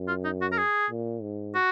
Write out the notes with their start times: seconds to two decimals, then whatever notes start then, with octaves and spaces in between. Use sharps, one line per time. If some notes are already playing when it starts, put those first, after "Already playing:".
Already playing: F#2
0.08 F4
0.24 D#4
0.41 F#4
0.52 A#4
0.58 G#4
0.90 A#2
1.22 G#2
1.55 F#4